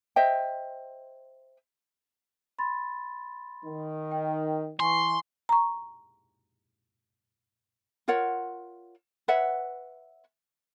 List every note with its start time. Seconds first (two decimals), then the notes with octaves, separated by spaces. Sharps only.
0.16 C5 D#5 E5 G5
2.59 B5 C6 A6
3.65 D#3
4.11 G5
4.80 E3 G#5 C6 C#6
5.49 A#5 C#6
8.08 F4 A#4 C#5 F#5
9.28 B4 C#5 E5 F#5